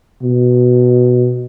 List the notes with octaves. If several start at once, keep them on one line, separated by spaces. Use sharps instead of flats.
B2